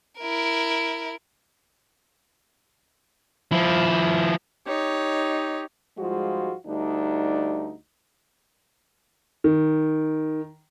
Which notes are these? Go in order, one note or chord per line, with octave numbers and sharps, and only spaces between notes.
E4 A#4
F3 E4
D#4 G4 C#5
G#2 F3 G3 G#3 F4 F#4
D2 G3 D4 D#4
D#3